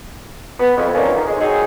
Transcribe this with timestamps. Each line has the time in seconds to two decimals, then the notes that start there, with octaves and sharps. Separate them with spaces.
0.60 B3
0.77 F2
0.95 D3 D#3 F3 F#3 A#3 C#4
1.14 D#3
1.27 G#3
1.40 F#3 C4 D#4 G#4